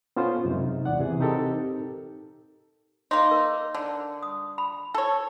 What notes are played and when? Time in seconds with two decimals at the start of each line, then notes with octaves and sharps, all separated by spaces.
0.16 B3 C#4 F4 A4 C5
0.45 F#2 C3 G#3 D#4
0.85 E2 D5 F#5
1.00 C3 E3 G#4
1.20 C4 D#4 G4 A4 A#4
3.11 A#3 D#4 C6
3.31 A#4 E6
3.75 D3
4.23 D#6
4.58 B5
4.94 A4 C#5